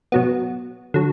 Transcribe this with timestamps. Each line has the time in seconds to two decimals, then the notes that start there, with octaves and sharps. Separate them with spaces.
0.12 B2 F#3 B3
0.94 D3 F#3